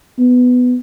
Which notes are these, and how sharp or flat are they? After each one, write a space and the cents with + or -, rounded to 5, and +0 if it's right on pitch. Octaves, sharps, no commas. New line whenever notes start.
B3 +10